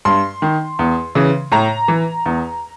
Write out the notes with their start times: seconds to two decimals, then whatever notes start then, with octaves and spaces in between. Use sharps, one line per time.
0.05 G2 C6
0.42 D#3
0.79 E2
1.15 C#3 E3
1.52 A2 A#5
1.88 E3
2.26 E2